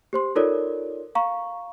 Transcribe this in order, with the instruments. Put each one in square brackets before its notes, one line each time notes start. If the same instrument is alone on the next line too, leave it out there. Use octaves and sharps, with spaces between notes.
[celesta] G4 C5 C6
D#4 F4 A4 A#4 C#5 D5
F5 A#5 C#6